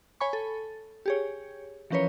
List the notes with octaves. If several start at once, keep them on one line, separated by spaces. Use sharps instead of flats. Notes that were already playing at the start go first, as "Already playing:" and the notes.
C#5 G#5 B5 C#6
A4
G4 G#4 C#5
E3 F3 C#4 A#4 B4 C#5